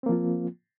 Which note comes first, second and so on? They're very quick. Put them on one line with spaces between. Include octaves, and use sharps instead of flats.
C4 A#3 F3 F4